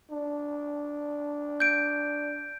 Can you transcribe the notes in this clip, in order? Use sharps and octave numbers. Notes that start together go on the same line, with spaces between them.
D4
G6 D7